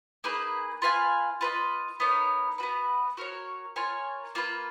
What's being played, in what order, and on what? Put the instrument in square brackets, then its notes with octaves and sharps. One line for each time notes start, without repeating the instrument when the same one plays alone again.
[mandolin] A#3 D#4 G#4 B4
F4 B4 F5 G#5
F4 B4 D#5
B3 D#4 A#4 C#5
B3 F#4 B4
F#4 A#4 C#5
F4 A#4 C#5 G#5
A#3 F4 B4